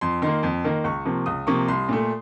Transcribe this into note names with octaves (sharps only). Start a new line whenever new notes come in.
F2 C6
D#3 A#3 C6
F2
D#3 A#3
C#2 C#6
C3 F3 A#3
C#2 D#6
C3 F3 A#3 C#6
C2 C6
A#2 A3